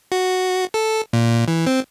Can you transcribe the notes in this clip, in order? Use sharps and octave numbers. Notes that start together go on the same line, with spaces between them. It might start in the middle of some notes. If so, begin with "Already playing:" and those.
F#4
A4
A#2
E3
C4